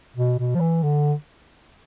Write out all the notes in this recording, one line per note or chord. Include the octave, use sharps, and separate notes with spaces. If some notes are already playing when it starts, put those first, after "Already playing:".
B2
B2
F3
E3
D3